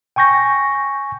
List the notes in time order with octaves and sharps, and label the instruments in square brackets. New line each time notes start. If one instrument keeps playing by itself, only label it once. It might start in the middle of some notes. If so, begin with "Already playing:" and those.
[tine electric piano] G5 G#5 C#6 G6 A#6